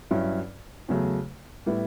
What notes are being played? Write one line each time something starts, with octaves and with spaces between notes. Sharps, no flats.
G2 F#3 C#4 E4
E2 C#3 F#3 A3
A2 G3 B3 E4